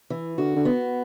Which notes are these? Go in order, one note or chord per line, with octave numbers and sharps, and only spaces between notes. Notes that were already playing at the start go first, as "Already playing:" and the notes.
E3
D3 F#4
D3
B3